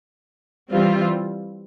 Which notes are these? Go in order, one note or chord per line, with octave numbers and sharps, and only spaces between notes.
E3 G3 C4 F4